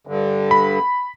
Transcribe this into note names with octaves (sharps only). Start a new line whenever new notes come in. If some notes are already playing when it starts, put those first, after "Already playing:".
G2 D3
B5